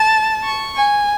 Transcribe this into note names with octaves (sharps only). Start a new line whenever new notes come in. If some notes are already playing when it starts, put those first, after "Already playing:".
Already playing: A5
C#6
G#5